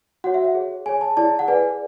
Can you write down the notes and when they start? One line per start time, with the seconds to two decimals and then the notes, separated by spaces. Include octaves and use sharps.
0.24 F#4 F#5
0.27 C#5
0.34 E5
0.45 F#5
0.55 G#4 C#5
0.86 G#4 C#5 G#5
1.01 A5
1.17 E4 G#4 D5 A5
1.39 F#5
1.48 G#4 B4 D5 G#5